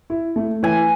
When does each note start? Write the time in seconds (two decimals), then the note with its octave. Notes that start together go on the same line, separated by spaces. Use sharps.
0.10 E4
0.36 A3
0.63 E3 G#5